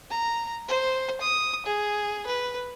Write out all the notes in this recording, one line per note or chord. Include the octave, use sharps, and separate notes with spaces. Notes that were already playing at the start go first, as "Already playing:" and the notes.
A#5
C5
D#6
G#4
B4